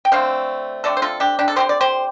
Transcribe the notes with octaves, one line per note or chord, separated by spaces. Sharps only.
G5
D3 A3 C4 C5 F5
D3 A3 C4 A4 D5
C5
F4 A4
D4 G4
D4 G4
A4
D3 G3 C4 G4 C5
D5
G4 C5